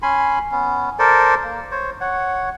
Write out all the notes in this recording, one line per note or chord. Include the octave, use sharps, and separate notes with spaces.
C#4 G#5 B5 C6
B3 C#4
A4 A#4 C5 D5
A#3
C5 C#5
C#5 F#5